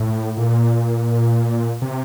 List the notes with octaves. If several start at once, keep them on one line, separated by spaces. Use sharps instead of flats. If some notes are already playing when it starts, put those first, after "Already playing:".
Already playing: A2
A#2
C3